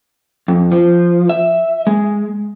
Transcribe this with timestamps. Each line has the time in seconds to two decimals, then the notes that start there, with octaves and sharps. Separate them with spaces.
0.48 F2
0.72 F3
1.29 E5
1.87 G#3